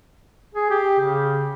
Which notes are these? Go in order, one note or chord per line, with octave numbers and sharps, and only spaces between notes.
G#4
G4
C#3